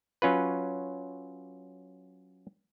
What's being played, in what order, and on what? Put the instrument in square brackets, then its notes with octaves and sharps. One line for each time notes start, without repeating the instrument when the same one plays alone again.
[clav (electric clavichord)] F#3 C#4 F4 B4